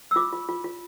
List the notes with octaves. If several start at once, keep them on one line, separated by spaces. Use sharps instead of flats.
E6
F4 D6
F4
F4
F4